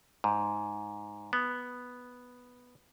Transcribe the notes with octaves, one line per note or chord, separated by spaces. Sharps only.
G#2
B3